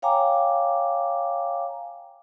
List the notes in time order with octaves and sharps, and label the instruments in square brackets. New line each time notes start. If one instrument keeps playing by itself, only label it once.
[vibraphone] C#5 F5 G5 G#5 A#5 D6